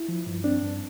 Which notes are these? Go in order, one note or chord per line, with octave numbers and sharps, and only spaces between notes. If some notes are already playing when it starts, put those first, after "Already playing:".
Already playing: E4
F3
G2
C4 D4
G2